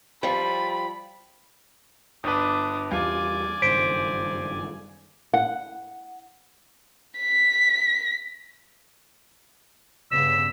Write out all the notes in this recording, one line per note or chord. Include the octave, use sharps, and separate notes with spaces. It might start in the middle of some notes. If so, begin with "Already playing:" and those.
F3 G3 B5
G1 D4 B4 D#6
E2 G3 F4 D5 G#5
F#1 G2 D#3 C5 B6 D7
F#5
B6
G2 C#3 B3 E6 B6